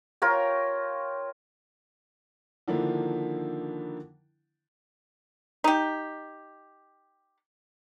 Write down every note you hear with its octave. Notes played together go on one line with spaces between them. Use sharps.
F4 A#4 C#5 G5
D3 D#3 F3 A#3 D4 E4
D#4 G4